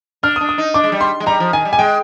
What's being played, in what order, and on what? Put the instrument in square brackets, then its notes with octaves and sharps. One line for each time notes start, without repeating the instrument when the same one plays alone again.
[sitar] D4 [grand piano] F6
[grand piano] D#6
[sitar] D4
[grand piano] D#6
[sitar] D#4
[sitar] D4 [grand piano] D6
[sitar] G#3
G3
[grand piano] C6
[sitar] G#3
[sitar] G3 [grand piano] A#5
[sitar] F3
[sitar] D#3 [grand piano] G#5
[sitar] G3
[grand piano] G#5
[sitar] G#3 [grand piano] G5